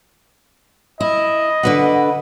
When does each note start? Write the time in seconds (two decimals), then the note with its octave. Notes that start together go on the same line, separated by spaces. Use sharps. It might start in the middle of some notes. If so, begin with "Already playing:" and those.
1.00 E4 D#5
1.63 D3 B4 F#5